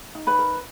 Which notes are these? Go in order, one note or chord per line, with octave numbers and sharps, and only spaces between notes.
D#4
B4 B5
A#4